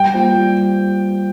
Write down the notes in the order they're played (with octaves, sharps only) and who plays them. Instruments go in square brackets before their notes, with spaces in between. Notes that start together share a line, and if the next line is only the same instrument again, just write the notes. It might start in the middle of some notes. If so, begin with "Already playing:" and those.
Already playing: [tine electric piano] G3 [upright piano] G5
[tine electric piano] A#3 F4 C5
G3